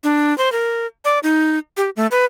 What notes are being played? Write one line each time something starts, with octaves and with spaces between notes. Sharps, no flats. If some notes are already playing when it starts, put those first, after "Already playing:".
D4
C5
A#4
D5
D#4
G4
A3
B4